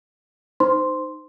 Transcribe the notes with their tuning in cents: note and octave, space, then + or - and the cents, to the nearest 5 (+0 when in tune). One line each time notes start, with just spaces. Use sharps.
D#4 -15 C5 -15 C6 +0